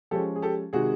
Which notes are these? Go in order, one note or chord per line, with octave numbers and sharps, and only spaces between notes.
F3 G#3 C#4 G4 A4
G#4
G4 A4
C3 D#3 G#3 F#4 G#4